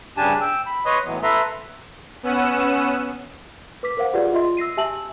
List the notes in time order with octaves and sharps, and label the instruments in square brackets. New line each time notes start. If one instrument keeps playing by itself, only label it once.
[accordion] G2 C#3 D4 G4 G#5 A5
G5 E6
B5
B4 C#5 D#5 C6 D#6
A2 E3 F#3 B3
A4 B4 E5 A#5 C6
[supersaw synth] B3 C#4 F#5 E6 D#7 E7
[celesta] B4 D6 B6
A#4 C5 F5 F#5
F4 G4 G#4 B4 D5 F#5
F4 D#5 E5 C6
E6 A#6 C7 D#7
G4 E5 G#5 A5 E6 F#7